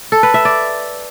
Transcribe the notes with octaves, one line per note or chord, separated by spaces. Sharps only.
A4
B4
E5
D5